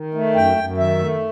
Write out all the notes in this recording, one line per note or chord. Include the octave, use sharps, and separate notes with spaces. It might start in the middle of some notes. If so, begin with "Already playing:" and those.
Already playing: D#3
A3
F#2 G5
F#2
D#3 E5
A3